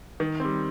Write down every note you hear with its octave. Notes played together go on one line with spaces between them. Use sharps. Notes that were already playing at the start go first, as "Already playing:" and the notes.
D#3
G3 C4